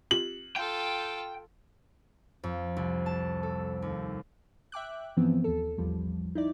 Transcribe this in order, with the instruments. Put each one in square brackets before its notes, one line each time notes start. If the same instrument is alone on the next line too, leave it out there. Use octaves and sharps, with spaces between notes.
[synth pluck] C4 F4 G4 [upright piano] F#7
[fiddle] F4 A4 [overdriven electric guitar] G5 [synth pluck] G6
[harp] F2
C2
A5
A4
D#2
[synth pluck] E5 G5 D6 F#6
G2 E3 F3 B3 C4
D#2 A4
A1 E2 F3 G3
D#4 E4 D5